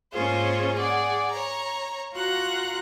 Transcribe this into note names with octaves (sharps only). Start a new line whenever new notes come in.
G#2 A#3 C#4 F4 G#4 C5
G#4 D5 F#5
C#5 A#5
F4 F#4 F#5 A#5 F#6